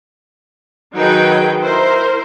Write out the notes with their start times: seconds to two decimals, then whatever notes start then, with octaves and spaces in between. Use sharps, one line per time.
0.95 D#3 F#3 D#4 G#4 B4 G5
1.62 E4 A#4 C5